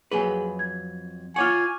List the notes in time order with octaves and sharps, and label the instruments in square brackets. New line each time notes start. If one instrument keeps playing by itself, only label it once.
[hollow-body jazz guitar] F2 F#3 B4 [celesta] G#4 G#5
[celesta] G#6
[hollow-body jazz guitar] F4 C#5 F#5 [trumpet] G#5 [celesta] C#6 D6 F6